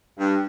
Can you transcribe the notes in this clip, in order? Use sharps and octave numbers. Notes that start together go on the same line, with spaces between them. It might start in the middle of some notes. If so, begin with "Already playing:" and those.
G2